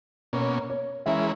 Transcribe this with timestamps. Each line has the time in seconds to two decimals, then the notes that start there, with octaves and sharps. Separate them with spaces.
0.33 B2 A#3 C#4 C#5
0.70 C#5
1.06 E3 G#3 C#4 E4 A#4 E5